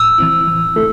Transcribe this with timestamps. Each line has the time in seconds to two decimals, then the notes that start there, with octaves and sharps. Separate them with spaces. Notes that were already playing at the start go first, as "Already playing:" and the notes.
Already playing: A2 E6
0.18 E3 C4 E4
0.47 E3
0.76 A3 E4 A4